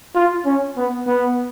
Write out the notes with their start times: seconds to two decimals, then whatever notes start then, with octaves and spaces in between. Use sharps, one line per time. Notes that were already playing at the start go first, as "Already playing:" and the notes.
0.15 F4
0.45 C#4
0.77 B3
1.07 B3